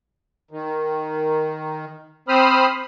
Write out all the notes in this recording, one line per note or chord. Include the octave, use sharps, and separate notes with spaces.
D#3
C4 C5 B5 D#6 F6